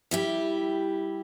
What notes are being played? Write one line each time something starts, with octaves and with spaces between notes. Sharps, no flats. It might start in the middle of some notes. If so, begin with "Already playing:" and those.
G3 E4 G4